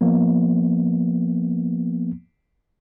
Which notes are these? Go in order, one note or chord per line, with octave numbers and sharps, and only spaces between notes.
F3 A#3 B3